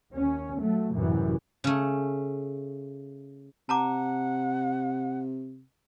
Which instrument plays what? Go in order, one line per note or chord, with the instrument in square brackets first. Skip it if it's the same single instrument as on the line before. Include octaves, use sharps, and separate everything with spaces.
[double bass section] D#2 C#4
F#3 A3
A1 F#2 C3 E3
[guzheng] C#3 A3
[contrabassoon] C3 [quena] F#5 [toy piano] A5 A#5 D6